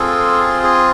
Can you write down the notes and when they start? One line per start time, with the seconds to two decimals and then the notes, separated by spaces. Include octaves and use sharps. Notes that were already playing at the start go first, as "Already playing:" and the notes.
Already playing: C4 F4 G#4 A4
0.63 G#4